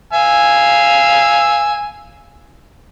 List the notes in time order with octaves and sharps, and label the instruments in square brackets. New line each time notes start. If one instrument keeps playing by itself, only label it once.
[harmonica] F5 G#5 E6